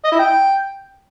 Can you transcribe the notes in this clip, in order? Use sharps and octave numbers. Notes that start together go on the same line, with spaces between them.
D#5
E4
G5